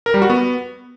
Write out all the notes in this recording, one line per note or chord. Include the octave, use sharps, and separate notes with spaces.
A#4
G3
F#4
B3